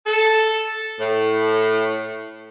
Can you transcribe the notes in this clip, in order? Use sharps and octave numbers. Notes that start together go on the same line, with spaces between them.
A4
A2